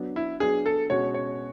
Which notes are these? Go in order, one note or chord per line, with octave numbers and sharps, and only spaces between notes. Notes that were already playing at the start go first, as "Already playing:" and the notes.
Already playing: F#3 B3 D4
E4
F#3 B3 D4 G#4
A4
B2 G#3 C#4 F#4 C#5
C#5